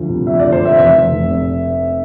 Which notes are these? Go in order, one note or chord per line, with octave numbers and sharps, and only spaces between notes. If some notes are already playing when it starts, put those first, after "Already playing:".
Already playing: D2 D3 F3
C3
F3 E5
D5
D2
C5
C3 E5
F1 E5
F1
F1
C3